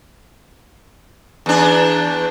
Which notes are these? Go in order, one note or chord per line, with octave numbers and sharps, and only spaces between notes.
E2 D4